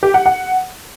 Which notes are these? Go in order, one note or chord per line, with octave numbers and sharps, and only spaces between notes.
G4
F#5
F#5